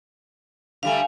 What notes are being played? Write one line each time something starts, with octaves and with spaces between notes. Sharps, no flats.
D3 G3 A3 F5 G#5